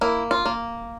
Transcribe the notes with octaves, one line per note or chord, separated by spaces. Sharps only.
A#3 E4
F4
A#3